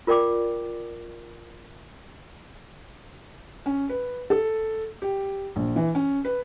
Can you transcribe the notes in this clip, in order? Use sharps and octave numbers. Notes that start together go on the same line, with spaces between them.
F4 A#4 D5 G5 D6
C#4
B4
A4
G4
A#1
E3
C#4
B4